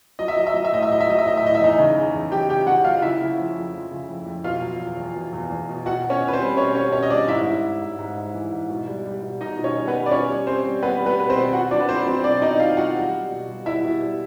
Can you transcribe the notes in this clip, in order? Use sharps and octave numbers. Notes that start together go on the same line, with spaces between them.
F#3 D#5
E5
F#3 D#5
E5
F#3 D#5
E5
A2 D#5
E5
F#3 D#5
E5
F#3 D#5
E5
A2 D#5
E5
A2 D#5
E5
E2 D#4 D#5
C#3
E2
E2
F#3 G4 G5
C#3 G4 G5
C#3 F#4 F#5
F#3 F4 F5
C#3 E4 E5
C#3
F3
F2
F3
C#3
F2
F2
B2 F4 F5
F#3
E2
E2
B2
E2
E2
B2
B2 F#4 F#5
B2
C#4 C#5
B2
B4
C4 C5
G3
B2 C#4 C#5
G3 C#4 C#5
B2 C#4 C#5
D#5
G3 D4 D5
G#2 E4 E5
G#2
G#2
G#2
G#2
G#2
E3
G#2
B2
G3
G3
B2
B2 D#4 D#5
B2
C#4 C#5
G3
B3 B4
G3
D5
B2 C#4 C#5
G3
G3 C4 C5
G3
G3 B3 B4
G3
B3 B4
B2 B4
C4 C5
B2
B2 F#4 F#5
F#3 D4 D5
B4
F#3 C4 C5
F#3 C4 C5
B2 D4 D5
B2 D#4 D#5
B2 F4 F5
F#3 F#4 F#5
G3
G3
B2
G3
G3 E4 E5
B2
G3